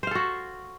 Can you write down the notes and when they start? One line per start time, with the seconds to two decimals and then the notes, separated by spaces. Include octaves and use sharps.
0.03 C5
0.07 F5
0.11 A4
0.15 F#4